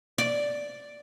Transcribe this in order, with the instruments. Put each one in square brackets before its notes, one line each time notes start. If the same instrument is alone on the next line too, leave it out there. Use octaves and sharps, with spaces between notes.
[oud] D5